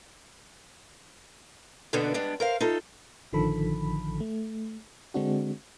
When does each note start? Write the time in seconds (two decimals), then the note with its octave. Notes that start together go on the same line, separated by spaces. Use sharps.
1.93 F#2 B2 D3 A#3 B3 D4
2.14 G3 G#3 B3 D4
2.40 A#4 C5 F5
2.60 D#4 F4 A4
3.33 A1 D3 D#3 F3 A4 B5
4.20 A3
5.14 D3 G#3 C4 D4 F#4